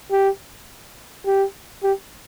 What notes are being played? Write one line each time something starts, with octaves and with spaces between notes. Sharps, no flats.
G4
G4
G4